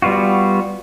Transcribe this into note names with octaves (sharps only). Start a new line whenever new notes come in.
G3 B3 F4 F#4